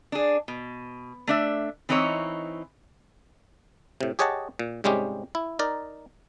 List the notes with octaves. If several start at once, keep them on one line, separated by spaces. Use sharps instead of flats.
D4 G#4
B2
A3 D4 E5
E3 C4 D#4 E4 C#5
A2 C3
G4 G#4 C#5 D#5 F#5 A5
A#2
G#2 C3 G3 G#3 C#4 G4
E4
D#4 A#4 D5